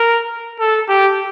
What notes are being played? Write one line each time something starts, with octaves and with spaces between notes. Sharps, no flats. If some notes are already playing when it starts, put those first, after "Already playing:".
Already playing: A#4
A4
G4